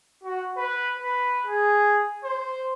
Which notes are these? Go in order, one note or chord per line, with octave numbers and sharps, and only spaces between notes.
F#4
B4
B4
G#4
C5